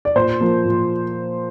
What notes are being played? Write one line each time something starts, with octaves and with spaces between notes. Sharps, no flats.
D5
A#2 C5
F3 A#3
A#2